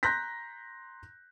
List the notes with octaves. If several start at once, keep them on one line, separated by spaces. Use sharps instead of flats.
A#5 C6 F#6 G6 A#6 B6